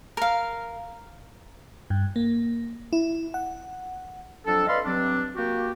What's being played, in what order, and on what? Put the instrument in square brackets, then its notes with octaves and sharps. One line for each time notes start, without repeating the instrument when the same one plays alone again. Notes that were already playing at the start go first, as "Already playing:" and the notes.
[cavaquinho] A#4 F5
[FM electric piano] G2
A#3
E4
F#5
[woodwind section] F2 F#3 D4 A4
B4 D5 D#5 F5 B5 C6
G2 F#3 C4 D4
A#3 F#4 G4